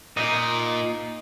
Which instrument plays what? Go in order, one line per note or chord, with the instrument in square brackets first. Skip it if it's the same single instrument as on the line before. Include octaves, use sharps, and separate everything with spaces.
[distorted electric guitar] A#2 [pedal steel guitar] D#4 D#5